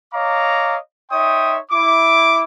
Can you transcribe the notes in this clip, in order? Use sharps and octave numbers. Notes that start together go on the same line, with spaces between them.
C#5 D#5 F5 A#5 D6
D#4 C#5 E5 G5 C6 D#6
E4 D6